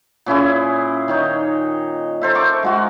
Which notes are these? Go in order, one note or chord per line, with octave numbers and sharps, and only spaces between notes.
A#2 C#4 E4 G#4
D#3 D#4 C#5
A4 C5 E5
A#4 C#6 D6
G#3 F4 F#4